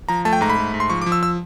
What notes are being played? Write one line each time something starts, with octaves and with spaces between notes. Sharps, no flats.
F3 A#5
A3 A5
G5
G#2 A#5
B5
A3
G#2
C6
F3 C#6
D6
F3
E6
E6